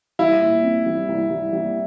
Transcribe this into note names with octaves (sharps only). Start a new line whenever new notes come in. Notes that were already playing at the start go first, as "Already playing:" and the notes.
G3 E4
A#2
C4
G3
C2
G3
G3